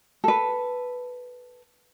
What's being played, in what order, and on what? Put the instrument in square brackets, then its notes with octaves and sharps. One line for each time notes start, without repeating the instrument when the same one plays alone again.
[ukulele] A4 B4